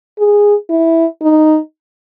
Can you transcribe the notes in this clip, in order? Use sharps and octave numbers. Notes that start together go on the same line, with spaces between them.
G#4
E4
D#4